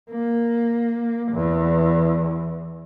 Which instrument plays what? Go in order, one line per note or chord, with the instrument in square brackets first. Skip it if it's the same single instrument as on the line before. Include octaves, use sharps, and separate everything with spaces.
[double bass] A#3
E2